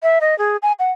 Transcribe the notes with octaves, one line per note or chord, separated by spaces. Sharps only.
E5
D#5
G#4
G#5
F#5